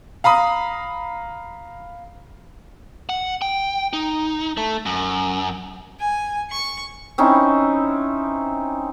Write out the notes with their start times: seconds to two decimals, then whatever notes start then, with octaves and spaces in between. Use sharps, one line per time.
0.24 F5 A#5 B5 D#6
3.09 F#5
3.42 G5
3.93 D#4
4.57 A3
4.86 F#2
6.00 G#5
6.50 C#6
7.18 C4 C#4 D#4 E4